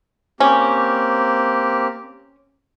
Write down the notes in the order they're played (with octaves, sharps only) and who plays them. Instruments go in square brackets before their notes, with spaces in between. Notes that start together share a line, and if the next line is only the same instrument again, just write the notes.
[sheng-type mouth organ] A#3 C4 G4 [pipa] C#4